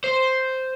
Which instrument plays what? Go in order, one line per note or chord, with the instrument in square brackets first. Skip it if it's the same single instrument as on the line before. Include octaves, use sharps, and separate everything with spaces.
[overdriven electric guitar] C5